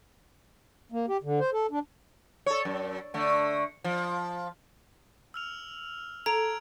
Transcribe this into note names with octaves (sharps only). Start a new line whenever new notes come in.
A#3
G4
D3
C5
A4
D4
A4 C#5
F#2
D3 A3
F3
E6 F6 F7
A4 A#5 G#6 D7 F7